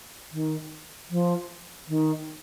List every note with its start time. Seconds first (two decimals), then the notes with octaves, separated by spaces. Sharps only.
0.32 D#3
1.10 F3
1.88 D#3